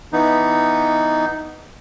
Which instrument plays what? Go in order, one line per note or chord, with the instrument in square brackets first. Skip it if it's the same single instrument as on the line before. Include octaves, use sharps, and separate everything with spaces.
[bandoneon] E3 B3 D#4